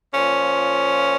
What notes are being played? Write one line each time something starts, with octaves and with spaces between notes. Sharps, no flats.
A#2 F3 C#4